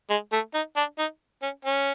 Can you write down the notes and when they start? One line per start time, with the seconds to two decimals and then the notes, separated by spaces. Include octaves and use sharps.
0.10 G#3
0.32 A3
0.54 D#4
0.77 D4
0.99 D#4
1.42 C#4
1.65 C#4